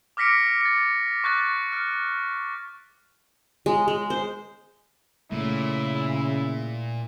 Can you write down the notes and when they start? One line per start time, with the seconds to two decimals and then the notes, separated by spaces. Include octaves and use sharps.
0.17 D6 F6 A#6 B6 C#7 D7
0.61 A6 C#7
1.24 C#6 F#6 A6
1.72 F6
3.66 G#3
3.88 G#3
4.10 C5
5.32 A#2 C#3 A3 E4